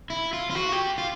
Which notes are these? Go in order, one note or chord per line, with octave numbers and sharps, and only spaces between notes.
E4
F4
F4
F#4
G4
F4